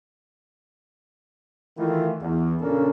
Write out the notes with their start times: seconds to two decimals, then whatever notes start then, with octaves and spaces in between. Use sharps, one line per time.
1.78 D#3 E3 A3 E4 F4
2.21 E2
2.60 A#2 C#3 A#3 C#4 D4 A4